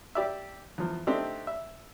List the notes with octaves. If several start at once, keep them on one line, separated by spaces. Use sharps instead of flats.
G4 D5 E5
E2 F3
A3 C4 D4 D#4 G4
E5